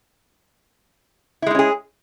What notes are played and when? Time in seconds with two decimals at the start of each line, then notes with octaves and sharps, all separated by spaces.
1.42 E4
1.46 G#3
1.51 D#4
1.55 C#4
1.59 G#4